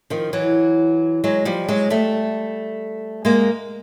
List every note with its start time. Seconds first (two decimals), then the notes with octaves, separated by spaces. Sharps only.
0.10 D#3 F3
0.33 E3 F#3
1.24 F#3 G#3
1.45 F3 G3
1.69 F#3 G#3
1.90 G3 A3
3.25 G#3 A#3